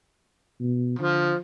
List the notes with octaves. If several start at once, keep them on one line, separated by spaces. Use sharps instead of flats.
B2
D3 F3